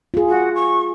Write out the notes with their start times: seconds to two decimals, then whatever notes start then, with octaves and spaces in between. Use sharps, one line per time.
0.14 F4 G#4
0.28 F#4
0.55 C#6